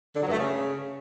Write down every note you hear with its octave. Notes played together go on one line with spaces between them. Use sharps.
D3
F#3
G2
A3
C#3